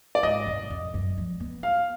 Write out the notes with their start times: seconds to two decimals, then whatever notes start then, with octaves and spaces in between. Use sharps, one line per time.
0.15 D5
0.23 G#2 D#5
0.47 F#2
0.70 F2
0.94 F#2
1.18 F3
1.40 B3
1.63 F5